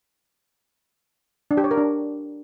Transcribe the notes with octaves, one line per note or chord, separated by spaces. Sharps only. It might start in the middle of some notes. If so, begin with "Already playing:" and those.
D4
G4
C#5
A#4
D4